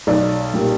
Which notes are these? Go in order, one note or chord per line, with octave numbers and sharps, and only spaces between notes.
B1 D5
A#2 G3